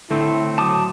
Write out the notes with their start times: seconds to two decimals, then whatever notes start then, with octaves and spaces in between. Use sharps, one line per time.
0.10 A2 D3 A3 C4 E4
0.58 F#3 A5 D6 D#6